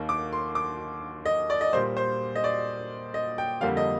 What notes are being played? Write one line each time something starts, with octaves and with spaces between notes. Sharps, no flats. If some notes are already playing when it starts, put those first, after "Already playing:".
Already playing: D#2 D#3 A#3
D6
C6
D6
D#5
D5
D#5
A#2 G3 A#3 C5
C5
D#5
D5
D#5
G5
F2 D3 G3 A#3 F5
D#5